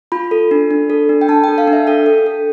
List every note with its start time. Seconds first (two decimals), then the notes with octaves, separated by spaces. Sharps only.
0.12 F4 B5
0.31 A4
0.51 D4
0.71 D4
0.90 A4
1.09 D4
1.21 G5
1.29 D4 A5
1.44 A4 G5
1.58 F5
1.68 D4
1.73 E5
1.87 A4 G5
2.06 A4
2.26 A4